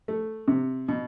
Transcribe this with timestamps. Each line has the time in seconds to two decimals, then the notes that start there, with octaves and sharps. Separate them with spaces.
0.08 A3
0.48 C3
0.88 B2